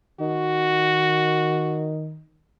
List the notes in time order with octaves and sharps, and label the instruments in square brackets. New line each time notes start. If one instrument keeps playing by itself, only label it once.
[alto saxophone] D#3 [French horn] F#4